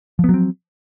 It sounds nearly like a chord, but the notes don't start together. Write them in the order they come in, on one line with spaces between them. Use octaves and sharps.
F3 B3 F#3 C4